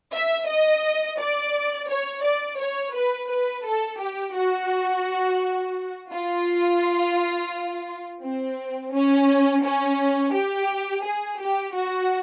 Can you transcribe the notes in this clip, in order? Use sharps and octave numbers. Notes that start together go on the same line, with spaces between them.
E5
D#5
D5
C#5
D5
C#5
B4
B4
A4
G4
F#4
F4
C4
C#4
C#4
G4
G#4
G4
F#4